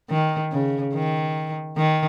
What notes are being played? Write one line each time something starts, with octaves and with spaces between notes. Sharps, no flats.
D#3
C#3
D#3
D#3